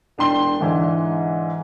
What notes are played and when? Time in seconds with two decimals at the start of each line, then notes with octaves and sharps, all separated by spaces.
0.18 E1 D4 G5 C6 G7
0.60 G#2 D3 E3